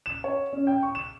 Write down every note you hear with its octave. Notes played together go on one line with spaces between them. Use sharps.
E7
C#5
C#4
G5
C#6
E7